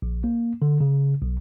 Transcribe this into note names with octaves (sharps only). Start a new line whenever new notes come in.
A#1
A#3
D3
C#3
B1